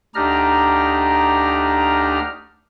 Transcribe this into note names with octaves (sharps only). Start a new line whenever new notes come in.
D2 D4 D#4 G4 A#5 F6